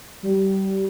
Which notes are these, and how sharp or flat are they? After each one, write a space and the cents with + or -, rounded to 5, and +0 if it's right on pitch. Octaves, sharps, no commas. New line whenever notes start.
G3 -25